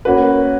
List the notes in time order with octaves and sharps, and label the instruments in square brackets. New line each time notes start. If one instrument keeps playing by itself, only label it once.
[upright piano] A#3 C#4 F#4 B4